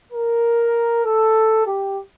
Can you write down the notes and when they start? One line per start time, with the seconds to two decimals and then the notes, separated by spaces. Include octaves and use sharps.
0.11 A#4
1.05 A4
1.66 G4